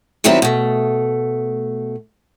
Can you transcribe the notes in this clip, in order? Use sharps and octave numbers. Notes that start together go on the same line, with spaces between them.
D#3 F#3 G3 B3 C4 E4
B2 A3